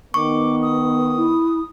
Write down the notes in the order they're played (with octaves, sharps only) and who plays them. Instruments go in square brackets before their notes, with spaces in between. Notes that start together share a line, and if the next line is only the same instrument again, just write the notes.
[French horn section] D#3 B3 [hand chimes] C#6 [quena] D6
[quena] D#6
[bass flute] E4